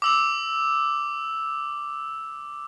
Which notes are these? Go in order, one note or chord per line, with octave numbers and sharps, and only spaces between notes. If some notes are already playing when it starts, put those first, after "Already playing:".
D6 E6 F7